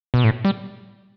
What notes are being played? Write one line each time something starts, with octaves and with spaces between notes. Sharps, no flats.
B2
A2
G3